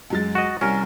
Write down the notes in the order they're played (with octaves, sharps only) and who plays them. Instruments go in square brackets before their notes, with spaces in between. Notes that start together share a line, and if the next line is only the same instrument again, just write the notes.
[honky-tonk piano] F#2 G#3 A6
[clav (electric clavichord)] F#4 D#5
[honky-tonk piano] C2 [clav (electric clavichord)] C#4 A#4